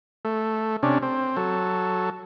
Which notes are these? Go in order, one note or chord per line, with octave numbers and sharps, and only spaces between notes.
A3
C3 C#4 D4
C4
F#3 A4